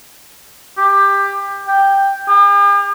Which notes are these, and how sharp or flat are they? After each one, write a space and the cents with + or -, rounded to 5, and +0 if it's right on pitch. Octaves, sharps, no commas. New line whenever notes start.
G4 +20
G5 +5
G4 +45